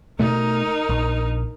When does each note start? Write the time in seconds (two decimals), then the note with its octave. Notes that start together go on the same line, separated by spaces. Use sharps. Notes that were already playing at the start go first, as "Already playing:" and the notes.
0.20 B2 A3 D#4 A#4
0.89 A#1